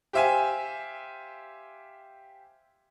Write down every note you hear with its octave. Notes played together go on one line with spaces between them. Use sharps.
G4 C5 E5 F5 G#5